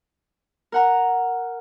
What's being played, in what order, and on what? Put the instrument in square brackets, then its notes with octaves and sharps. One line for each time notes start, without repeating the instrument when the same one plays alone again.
[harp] A#4 F#5 A#5